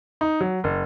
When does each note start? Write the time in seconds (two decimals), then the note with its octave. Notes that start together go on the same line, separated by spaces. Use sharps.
0.21 D#4
0.41 F#3
0.64 F#1